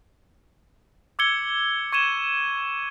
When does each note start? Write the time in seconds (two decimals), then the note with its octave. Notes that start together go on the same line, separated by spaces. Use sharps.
1.19 D6 E6 G#6 C#7 G7
1.92 C#6 G#6 D#7 E7 G7